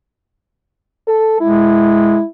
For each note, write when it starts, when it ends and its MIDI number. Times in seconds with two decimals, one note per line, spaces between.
1.08 1.36 69
1.41 2.21 56
1.41 2.25 64